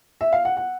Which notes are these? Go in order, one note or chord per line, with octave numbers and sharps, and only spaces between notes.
E5
F5
F#5
F#5